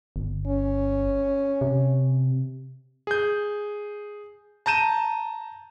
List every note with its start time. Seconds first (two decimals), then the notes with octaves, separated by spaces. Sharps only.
0.16 G1
0.47 C#4
1.61 C3
3.07 G#4 G6
4.66 A5 A#5 G6 D#7 E7